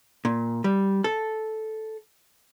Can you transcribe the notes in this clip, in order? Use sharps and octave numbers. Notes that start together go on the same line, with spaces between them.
A#2
G3
A4